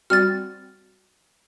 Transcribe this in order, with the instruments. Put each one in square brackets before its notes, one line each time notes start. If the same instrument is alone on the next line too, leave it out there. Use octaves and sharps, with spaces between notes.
[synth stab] G3 C4 F#4 [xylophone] F6 A6